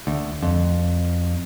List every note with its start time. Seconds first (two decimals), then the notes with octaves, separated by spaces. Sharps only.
0.07 D2
0.42 F2